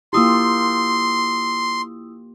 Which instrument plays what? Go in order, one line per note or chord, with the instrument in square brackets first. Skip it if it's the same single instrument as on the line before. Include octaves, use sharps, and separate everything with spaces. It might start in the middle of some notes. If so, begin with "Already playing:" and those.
[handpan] A#3 F4 G4 [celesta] E4 D#6 E6 [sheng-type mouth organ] C6